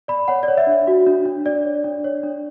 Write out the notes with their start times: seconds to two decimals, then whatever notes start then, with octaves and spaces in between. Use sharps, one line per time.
0.08 D5 B5
0.28 C#5 F#5
0.43 D5
0.48 C#5
0.58 E5
0.67 D4
0.87 F#4
1.06 D4
1.26 D4
1.45 D4 D5
1.65 C#5
1.84 D4
2.04 C#5
2.23 D4